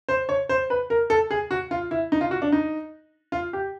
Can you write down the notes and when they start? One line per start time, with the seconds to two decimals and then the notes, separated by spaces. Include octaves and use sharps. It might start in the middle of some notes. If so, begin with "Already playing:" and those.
0.09 C5
0.29 C#5
0.49 C5
0.70 B4
0.90 A#4
1.10 A4
1.31 G#4
1.51 F#4
1.71 F4
1.91 E4
2.12 D#4
2.21 F4
2.31 F#4
2.42 D4
2.52 D#4
3.32 F4
3.53 G4